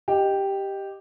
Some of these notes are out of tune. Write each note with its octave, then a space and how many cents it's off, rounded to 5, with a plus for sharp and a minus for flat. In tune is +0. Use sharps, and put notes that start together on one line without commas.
G4 +0 D#5 -5